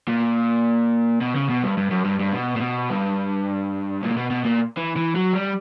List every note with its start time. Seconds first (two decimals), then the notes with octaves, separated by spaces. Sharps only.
0.08 A#2
1.21 B2
1.35 C#3
1.49 B2
1.63 G2
1.78 G2
1.91 F#2
2.05 G2
2.20 G2
2.34 B2
2.57 A#2
2.61 B2
2.90 G2
4.02 A#2
4.17 B2
4.31 B2
4.45 A#2
4.78 E3
4.96 E3
5.15 F#3
5.33 G3